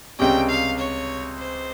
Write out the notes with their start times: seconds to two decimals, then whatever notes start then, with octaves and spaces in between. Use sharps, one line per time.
0.19 C#2 C3 G3 C#4 G5
0.49 F5
0.79 C#5
1.39 C5